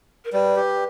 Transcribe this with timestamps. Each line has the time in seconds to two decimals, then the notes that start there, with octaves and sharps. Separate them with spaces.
0.25 A#4
0.32 G3 B4
0.57 G4